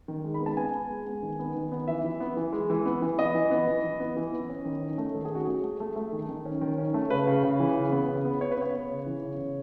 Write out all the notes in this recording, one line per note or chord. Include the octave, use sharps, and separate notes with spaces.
D#3
G#3
B5
B3
A5
B3 G#5
B3
G#3
B3
D#3
B3
D#3
B3
E3 E5
E3
B3
E3
G#3
E3
B3
E3
B3 D#5
E3
B3
E3
E3
B3
E3
B3
C#4
D#3
C#4
A3
D#3 A4
G#4
C#4 F#4
A3 G#4
A3
A3
A3
D#3
D#3
C#4
D#3
C#4
A3
C#3 B4
C#3
C#3
E3
C#3
B3
C#3
B3
B3 C#5
B4
B3 C#5
B3
C#3
E3
C#3
C#3